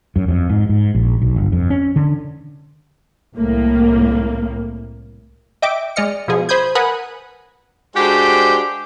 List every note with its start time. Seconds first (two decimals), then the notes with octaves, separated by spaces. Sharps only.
0.16 F#2
0.28 F2
0.50 G#2
0.69 G#2
0.95 A#1
1.22 B1
1.36 G1
1.52 F2
1.70 C#4
1.96 D3
3.34 C2 A2 A#3
5.62 D#5 E5 G5 D6
5.96 G#3 D5 D#5 F6 C#7
6.28 B2 F3 G#4
6.49 C5 B5 D#6 G6 G#6
6.75 A#4 B4 F#5 G#5 B5 D#6
7.96 G#3 D4 F#4 G4 A4 C5